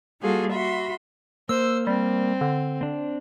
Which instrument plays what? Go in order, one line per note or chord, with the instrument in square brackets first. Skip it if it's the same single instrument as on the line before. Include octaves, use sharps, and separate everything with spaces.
[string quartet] G3 A#3 F4 F#4 G#4 A4
F#4 E5 B5 C6
[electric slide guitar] A#3 [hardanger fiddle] C5 [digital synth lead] E6
[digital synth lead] G3 [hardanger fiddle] C4
[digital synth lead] D3
[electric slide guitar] C4 D4